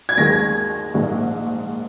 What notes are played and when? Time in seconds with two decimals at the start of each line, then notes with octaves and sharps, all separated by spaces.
0.09 G#6
0.17 D#2 D#3 G#3 A#6
0.94 A#1 G#2 D#3